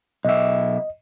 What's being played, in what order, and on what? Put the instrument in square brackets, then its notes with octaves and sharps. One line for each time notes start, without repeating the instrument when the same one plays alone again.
[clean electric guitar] B1 E5 [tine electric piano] D#5